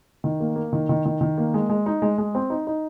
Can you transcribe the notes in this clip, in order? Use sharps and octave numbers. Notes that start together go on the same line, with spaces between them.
D#3
A#3
A#3
D#3
D#3
D#3
D#3
A#3
G#3
G#3
D#4
G#3
G#3
C4
D#4
D#4